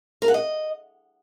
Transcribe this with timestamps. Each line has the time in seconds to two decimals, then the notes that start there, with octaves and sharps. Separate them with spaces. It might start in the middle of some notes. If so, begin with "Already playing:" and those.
0.22 A#4
0.28 F#5
0.34 D#5